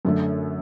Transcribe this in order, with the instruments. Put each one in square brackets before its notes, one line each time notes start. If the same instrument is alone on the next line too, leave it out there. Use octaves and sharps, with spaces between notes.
[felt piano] F#2 D3 A3